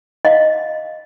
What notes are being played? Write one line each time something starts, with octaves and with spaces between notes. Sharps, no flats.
D#5 F5